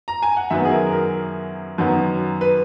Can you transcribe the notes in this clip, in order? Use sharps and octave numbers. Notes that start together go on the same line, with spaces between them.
A#5
G#5
F#5
F#2 D#3 F#3 B3 E5
G#4
A#4
A#4
F#2 D#3 F#3 B3
B4